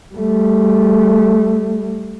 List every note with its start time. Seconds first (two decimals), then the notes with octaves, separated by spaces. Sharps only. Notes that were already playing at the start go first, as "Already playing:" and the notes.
0.14 G3 A3